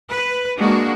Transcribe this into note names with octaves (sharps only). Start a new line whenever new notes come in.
B4
G#3 A#3 D4 F#4